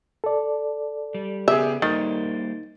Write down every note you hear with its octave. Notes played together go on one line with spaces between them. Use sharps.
A4 D5
G3
C#3 B3 G4 G#4 E5
D#3 G3 A#3 C5 A6